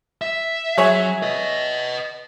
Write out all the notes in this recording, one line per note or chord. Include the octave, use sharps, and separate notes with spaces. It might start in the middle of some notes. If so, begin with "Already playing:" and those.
E5
F#3 G#4 C#5 E5
B4 D#5